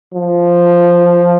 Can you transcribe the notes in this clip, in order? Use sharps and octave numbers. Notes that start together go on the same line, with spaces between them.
F3